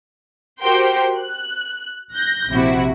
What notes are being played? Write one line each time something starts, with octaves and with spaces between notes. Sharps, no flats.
F#4 G4 A#4 C5 G5 C6
F#6
F#6 G6 A#6
A#1 C3 E4 F#4